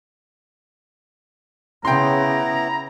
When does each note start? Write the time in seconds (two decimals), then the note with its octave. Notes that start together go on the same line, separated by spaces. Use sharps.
1.85 C#3 B3 E4 G5 A#5 C6